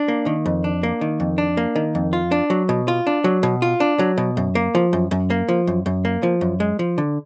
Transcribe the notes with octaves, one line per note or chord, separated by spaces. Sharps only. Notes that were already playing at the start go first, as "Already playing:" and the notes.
Already playing: D4
A#3
D#3
F2
D4
A#3
D#3
F2
D4
A#3
D#3
F2
F4
D4
F#3
B2
F4
D4
F#3
B2
F4
D4
F#3
B2
F#2
A#3
F3
F#2
F#2
A#3
F3
F#2
F#2
A#3
F3
F#2
G#3
F3
D3